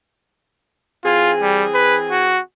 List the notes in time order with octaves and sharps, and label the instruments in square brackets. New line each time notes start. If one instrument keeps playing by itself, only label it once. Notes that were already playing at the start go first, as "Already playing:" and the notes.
[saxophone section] E3 C4 G#4 [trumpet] F4
[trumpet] G3
B4
F#4